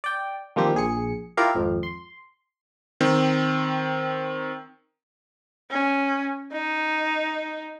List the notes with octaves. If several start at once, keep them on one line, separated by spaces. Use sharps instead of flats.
D5 G5
D#3 F3 G3 A#3 C4 G4
A#1 G#4 C#7
E4 F4 G4 A#4 D5 F5
G#1 F2
C6
D#3 C4
C#4
D#4